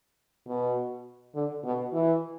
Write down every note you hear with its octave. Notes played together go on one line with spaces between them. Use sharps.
B2
D3
B2
E3